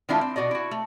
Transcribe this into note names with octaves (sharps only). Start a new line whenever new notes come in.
D#3 G#3 A3 D4 E4 F4
C4
B2 F#4 D5 D#5
E4 F#4
A3